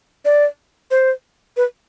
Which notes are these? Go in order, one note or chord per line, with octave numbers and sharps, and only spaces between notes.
D5
C5
B4